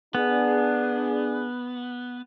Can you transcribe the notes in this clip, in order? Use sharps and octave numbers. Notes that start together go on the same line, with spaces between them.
B3 D4 G#4